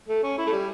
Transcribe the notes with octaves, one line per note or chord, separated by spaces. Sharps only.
A3
C#4
E4
A3
G3